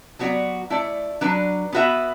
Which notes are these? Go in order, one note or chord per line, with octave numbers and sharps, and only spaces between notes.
F#3 B3 F#4 D5
A3 E4 D5
F#3 D4 B4
B3 F#4 B4 E5